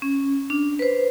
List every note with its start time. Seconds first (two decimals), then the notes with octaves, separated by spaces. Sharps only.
0.02 C#4
0.50 D4
0.79 B4 C5